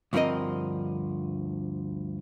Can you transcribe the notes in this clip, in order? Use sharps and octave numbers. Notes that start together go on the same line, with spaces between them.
D2 G2 F3 C4 A#4 D#5